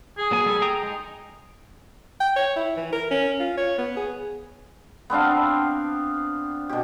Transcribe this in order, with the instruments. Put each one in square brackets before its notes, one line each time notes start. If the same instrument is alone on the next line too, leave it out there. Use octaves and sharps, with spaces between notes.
[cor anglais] G#4
[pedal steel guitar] F#3 A#3 G#5
G3 A4
G5 A#5 D#6
G#3 D#4
[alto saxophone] G5
C#5
E4
E3
A#4
C#4
F4
C#5
B3
G#4
[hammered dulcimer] B3 C4 D4 F5
B2 G4